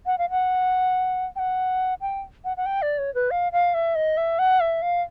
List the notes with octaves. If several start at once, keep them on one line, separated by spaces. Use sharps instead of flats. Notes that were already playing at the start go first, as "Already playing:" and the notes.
F#5
F5
F#5
G5
F#5
G5
F#5
F#5
G5
D5
C#5
B4
F5
F5
E5
D#5
E5
F#5
E5
F5